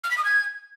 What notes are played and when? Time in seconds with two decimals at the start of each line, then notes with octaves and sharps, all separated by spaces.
0.04 F6
0.11 B6
0.18 D#6
0.25 G#6